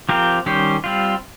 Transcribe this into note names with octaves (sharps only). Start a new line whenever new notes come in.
F3 C4 G4 A#4
D#3 G3 C#4 G4 C5
G3 C4 F4